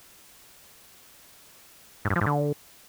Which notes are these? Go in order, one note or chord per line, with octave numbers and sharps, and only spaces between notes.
G#2
G2
F3
G#2
D3